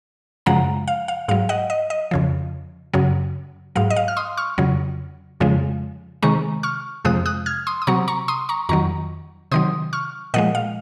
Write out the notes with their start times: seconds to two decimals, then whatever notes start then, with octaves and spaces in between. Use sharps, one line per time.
0.46 F#2 C#3 F3 G#3 F#5 A#5
0.88 F5
1.08 F5
1.28 G#2 F#3 F5
1.49 D#5 F#5
1.70 D#5
1.90 D#5
2.11 F2 C#3 F3
2.93 F#2 C#3 F#3
3.76 G#2 F#3 F5
3.90 D#5
3.96 F5
4.08 F6
4.17 C6 D#6
4.37 C#6 F6
4.58 F2 C#3 F#3
5.40 F2 C#3 F3 G#3
6.22 C3 D#3 G#3 A#5 C#6
6.63 C#6 F6
7.05 F2 C3 F3 G#3 D#6 F#6
7.26 D#6 F#6
7.46 F6 G#6
7.67 C6 D#6
7.82 D#6
7.87 C3 F#3 A#5 C#6
8.08 A#5 C#6
8.28 C6 D#6
8.49 A#5 C#6
8.69 F2 D#3 F#3 A#5 C#6
9.52 C3 D#3 F#3 C6 D#6
9.93 C#6 F6
10.34 A#2 F3 G#3 D#5 F#5
10.55 F5